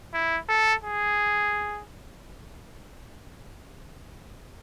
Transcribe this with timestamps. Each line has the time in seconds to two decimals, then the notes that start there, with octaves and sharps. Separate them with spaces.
0.14 E4
0.49 A4
0.84 G#4